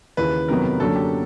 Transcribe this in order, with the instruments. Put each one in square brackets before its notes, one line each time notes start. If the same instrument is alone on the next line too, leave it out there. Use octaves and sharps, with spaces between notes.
[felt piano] D#2 C#3 E3 [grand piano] B4
[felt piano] F2 C3 D#3 F#3 B3 [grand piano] A#4
[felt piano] F#2 D3 F#3 A#3 D4 [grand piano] A4
[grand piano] G4